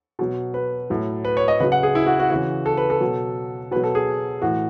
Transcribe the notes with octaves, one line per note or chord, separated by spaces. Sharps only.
B2 F#3
B4
A2 F#3
B4
C#5
D#5
C#3 F#3 B4
F#5
G#4
E4
F#4
F#4
C#3 E3 F#4
A4
B4
A4
B2 F#3
B2 F#3 B4
A4
G#4
A2 E3 F#4